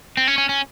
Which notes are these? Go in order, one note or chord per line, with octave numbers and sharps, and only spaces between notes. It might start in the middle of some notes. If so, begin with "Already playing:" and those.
C4
C#4
C#4
C#4